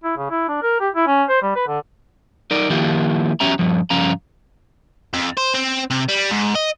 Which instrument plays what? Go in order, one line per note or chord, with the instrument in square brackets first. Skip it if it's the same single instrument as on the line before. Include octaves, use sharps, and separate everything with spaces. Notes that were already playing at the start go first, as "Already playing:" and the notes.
[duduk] E4
C#3
E4
D4
A#4
G4
E4
C#4
C5
G3
B4
D3
[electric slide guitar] D#4 A#4 D5
D#3 F3 A#3 E4 F4 G4
E2 F#3 C#4 G4 E5 A#5
G2 F3
G2 C#3 F3 C#4 F5 A#5
[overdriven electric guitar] F2
C5
C4
C3
G3
G#2
D#5